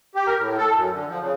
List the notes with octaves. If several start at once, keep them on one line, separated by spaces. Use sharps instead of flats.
G4
A#4
A2
A4
F#2
D3
F3
C#3